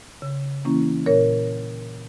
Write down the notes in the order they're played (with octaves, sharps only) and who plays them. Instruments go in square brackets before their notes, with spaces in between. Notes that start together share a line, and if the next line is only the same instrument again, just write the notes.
[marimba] C#3
E3 A#3 C#4 E4
A#2 A#4 C#5